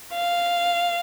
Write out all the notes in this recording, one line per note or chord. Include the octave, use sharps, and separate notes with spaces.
F5